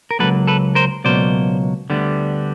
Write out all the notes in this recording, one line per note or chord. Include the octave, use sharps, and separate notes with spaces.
A#4
C#2 B2 F#3 A#3 A4 B4
A4 B4
A#4 C5
C#2 B2 F#3 A#3 C5 D5
D2 D3 G3 B3